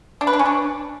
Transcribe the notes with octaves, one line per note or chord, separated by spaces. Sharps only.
D4
B4
D4
C#4
D4